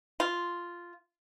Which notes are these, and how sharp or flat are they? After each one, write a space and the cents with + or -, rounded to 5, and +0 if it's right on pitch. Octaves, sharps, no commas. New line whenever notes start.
F4 -5